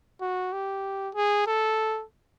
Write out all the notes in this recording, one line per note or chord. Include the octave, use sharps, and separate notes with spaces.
F#4
G4
G#4
A4